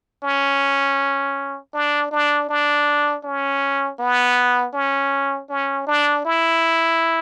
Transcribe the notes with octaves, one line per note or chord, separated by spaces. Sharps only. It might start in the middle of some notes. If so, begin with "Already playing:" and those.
C#4
D4
D4
D4
C#4
B3
C#4
C#4
D4
E4